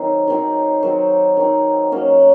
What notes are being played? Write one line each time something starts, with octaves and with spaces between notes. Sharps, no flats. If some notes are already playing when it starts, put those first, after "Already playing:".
Already playing: D#3 F#3 C4 D#4
D#3 F#3 C4 D#4
D#3 F#3 C4 D#4
D#3 F#3 C4 D#4
F#3 A#3 C#4 F#4